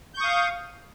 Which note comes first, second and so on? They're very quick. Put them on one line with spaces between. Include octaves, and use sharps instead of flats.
G6 C#6 D#6 F5